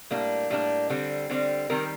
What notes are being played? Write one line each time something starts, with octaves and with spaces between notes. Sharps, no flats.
A2 G3 A#3 D4
A2 G3 A#3 D4
D3 G3 C4
D3 G3 C4
D#3 G3 C4 A#4